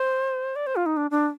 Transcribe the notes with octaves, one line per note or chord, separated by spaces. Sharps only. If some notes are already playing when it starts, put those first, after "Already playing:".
Already playing: C5
D5
C5
F4
D#4
D4
D4